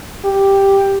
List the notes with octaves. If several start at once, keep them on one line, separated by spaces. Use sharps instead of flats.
G4